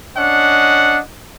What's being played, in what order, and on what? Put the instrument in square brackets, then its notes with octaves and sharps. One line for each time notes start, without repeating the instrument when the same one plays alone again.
[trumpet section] C#4 D4 D#5 F#5